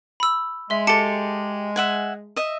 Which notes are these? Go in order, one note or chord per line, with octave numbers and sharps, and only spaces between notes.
B5 E6
G#3 E5 C6
G4 A4 A5 C#7
E5 F#5 G#5
D#5 E5